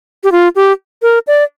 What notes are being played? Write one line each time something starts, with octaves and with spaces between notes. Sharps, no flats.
G4
F4
G4
A#4
D5